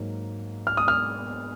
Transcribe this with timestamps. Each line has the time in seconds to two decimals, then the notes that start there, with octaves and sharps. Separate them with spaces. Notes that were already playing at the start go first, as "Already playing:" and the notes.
Already playing: G#2 F#3 A#3
0.67 F6
0.77 D#6
0.88 F6